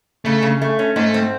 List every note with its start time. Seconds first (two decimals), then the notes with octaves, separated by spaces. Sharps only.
0.25 C#3 A3
0.43 C#3
0.62 A3
0.79 C#4
0.96 G#2 A3
1.14 C4